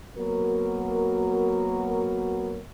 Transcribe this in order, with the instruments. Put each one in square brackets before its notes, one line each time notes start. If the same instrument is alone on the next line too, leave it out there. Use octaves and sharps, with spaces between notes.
[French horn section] F#3 A#3 B3 F#4 A#4